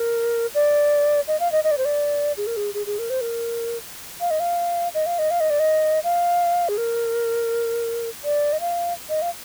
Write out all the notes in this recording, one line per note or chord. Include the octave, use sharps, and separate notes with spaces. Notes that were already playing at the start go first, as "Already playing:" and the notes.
Already playing: A#4
D5
D#5
F5
D#5
D#5
D5
C5
D5
G#4
A#4
G#4
G#4
G#4
A#4
C5
A#4
F5
D#5
F5
D#5
F5
D#5
F5
D#5
D5
D#5
F5
G#4
A#4
D5
D#5
F5
D#5
F5